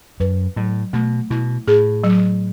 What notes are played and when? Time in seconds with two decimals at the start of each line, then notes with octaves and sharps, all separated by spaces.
0.20 F#2 B4
0.56 A2 F#3
0.93 B2 A3
1.30 B2 E4
1.67 A2 G#4
2.04 F#3